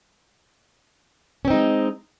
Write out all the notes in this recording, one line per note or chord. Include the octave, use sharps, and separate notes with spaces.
G#3 C4 C#4 D#4